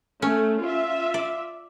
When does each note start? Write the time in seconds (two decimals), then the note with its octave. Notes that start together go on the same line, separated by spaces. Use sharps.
0.22 A3 C#4
0.61 F4 E5
1.14 D5